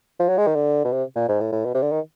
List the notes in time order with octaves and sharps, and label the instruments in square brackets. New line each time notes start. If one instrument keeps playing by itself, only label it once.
[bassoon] F3
F#3
G#3
D#3
D3
B2
C3
A#2
G#2
A2
A2
B2
C3
D3
D#3